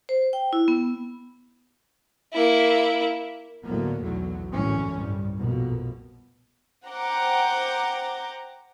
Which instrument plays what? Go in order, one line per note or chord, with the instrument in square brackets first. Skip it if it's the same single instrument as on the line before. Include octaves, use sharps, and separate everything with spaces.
[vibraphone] C5
G5
E4
B3
[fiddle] A#3 E4
[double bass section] D2 A2 D3 F#3 A#3 B3
B1 E2 D3 F#3 A3 B3
G#1 F#2 A2 D3 E3 C#4
C2 G2 G3
A#1 F2 B2 A#3
[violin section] C5 F#5 G5 A#5 D6